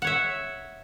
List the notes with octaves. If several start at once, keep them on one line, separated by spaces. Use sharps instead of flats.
C#5 E5 F#5